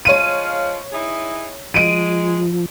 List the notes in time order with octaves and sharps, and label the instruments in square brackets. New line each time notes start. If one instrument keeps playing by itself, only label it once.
[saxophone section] F3 G#3 F5 [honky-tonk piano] C#5 D#7
[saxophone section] D#4 E4 G#4
[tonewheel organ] F3 [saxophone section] G#3 [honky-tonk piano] D7 D#7